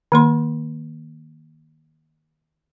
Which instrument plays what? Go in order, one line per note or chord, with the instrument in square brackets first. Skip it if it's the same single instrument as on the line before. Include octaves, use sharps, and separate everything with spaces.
[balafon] D#3 A#3 C6